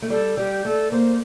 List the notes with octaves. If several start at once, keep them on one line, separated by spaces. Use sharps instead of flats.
A3
G3 A4
G3 G4
A3 A4
A#3 C5